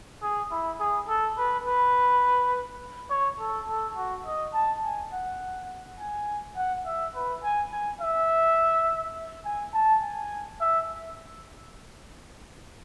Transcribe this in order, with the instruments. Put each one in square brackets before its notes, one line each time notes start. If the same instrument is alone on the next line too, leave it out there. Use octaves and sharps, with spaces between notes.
[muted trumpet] G#4
E4
G#4
A4
B4
B4
C#5
A4
A4
F#4
D#5
A5
G#5
F#5
G#5
F#5
E5
B4
G#5
G#5
E5
G#5
A5
G#5
E5